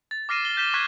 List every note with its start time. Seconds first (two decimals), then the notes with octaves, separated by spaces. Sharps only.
0.11 A6
0.29 D6 F6 A#6 C7 D#7 E7
0.45 G7
0.57 G6 A#6 B6 E7 G7
0.74 C#6 F#6 G#6 B6 D#7